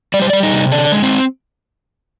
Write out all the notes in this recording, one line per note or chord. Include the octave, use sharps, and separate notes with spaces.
G3 D5
C5
G3 D5
D#4
C3
D3 D4
G#3
C4